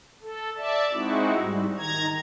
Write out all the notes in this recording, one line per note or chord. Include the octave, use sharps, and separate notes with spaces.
A4
D5 E5 A5
G#3 C4 D#4 E4 F#4
G#2 G3
D#3 A#5 G#6